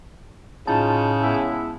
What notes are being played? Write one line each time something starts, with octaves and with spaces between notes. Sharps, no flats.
A2 C#3 D#4 F4 G#4 A5 G6
G#3 B3 E4